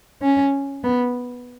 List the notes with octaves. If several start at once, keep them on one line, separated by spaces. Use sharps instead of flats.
C#4
B3